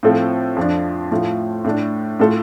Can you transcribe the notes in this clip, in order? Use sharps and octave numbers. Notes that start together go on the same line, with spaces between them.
A2 F3 C4 A4
F2 F3 D4
A2 F3 A3 F4
A2 A3 D4
A2 A3 F4 A4